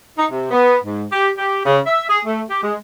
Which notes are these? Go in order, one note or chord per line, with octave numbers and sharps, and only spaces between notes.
D#4
C3
B3
G#2
G4
G4
C#3
E5
G#4
A3
G4
G#3